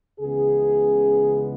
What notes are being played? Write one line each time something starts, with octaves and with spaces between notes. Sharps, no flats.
C#2 C#3 E3 G#3 B3 G#4